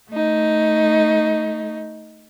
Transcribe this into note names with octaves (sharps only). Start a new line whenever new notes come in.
A3 D#4